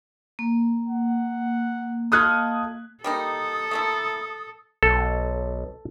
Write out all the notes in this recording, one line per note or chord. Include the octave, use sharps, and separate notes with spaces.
A#3
F#5
F4 A4 D#5 D#6 F#6 G#6
G3 A#3 D#4 A4 D#6
A3 A#3 E4
B1 A4